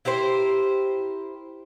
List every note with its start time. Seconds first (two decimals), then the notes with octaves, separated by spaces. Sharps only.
0.05 E4 G4 A#4 C5